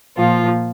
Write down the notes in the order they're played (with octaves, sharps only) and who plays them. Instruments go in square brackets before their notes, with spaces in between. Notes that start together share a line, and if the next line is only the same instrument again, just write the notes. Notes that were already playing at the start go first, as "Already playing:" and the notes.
[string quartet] A#2 F3 F4